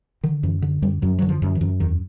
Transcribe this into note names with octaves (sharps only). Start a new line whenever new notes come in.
D3 D#3
F#2 E3
D3
F#2 G3
F#2 F#3
D3 F#3
F3
F#2
E3
F#2
E2 D#3